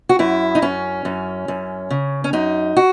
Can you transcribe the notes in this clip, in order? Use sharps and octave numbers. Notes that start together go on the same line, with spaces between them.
F#4
F#2 E4
D#4
F#2 C#4
F#2
F#2
C#3
C#4
F#2 D#4
F#4